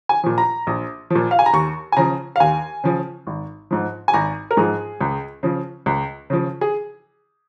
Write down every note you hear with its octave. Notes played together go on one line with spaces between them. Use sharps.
G#5
A#2 F3
A#5
A#1
A#2 F3
F5
G#5
A#5
D#2 C#6
G#5
C#3 F3 A#5
F5
D#2 G#5
C#3 F3
G#1
G#2 F3
G#5
G#1 A#5
A#4
G#2 F3 G#4
C#2
C#3 F3
C#2
C#3 F3
G#4